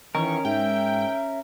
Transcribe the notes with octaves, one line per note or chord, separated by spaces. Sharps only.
D#3 E3 C#4 A#4 C#6
G#2 E5 G5